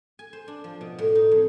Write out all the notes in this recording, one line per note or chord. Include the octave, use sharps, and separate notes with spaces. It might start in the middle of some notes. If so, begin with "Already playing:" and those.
G#5
C5
D4
F3
B2
A2
D#4
F2